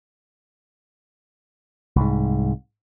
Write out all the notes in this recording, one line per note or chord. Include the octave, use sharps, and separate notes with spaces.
C2 G#2